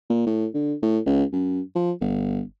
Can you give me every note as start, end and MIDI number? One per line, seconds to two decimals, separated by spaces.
0.10 0.24 46
0.27 0.46 45
0.54 0.74 50
0.82 0.99 45
1.06 1.24 37
1.33 1.61 42
1.75 1.92 53
2.01 2.40 31